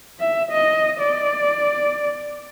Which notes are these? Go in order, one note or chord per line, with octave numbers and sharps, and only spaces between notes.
E5
D#5
D5